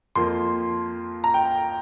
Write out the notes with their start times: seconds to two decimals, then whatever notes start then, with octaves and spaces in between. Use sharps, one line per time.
0.16 F2 F3 A#3 C6
1.24 A#5
1.34 G5